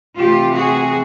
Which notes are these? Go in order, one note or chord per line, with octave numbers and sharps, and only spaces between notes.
C3 E3 A3 F4 G4
F#4 G#4